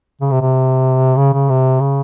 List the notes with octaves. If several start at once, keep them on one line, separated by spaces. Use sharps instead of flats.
C#3
C3
C3
C#3
C#3
C3
C#3